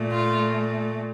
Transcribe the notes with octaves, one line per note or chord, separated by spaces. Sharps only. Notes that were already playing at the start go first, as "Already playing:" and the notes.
Already playing: A#2 A3
F4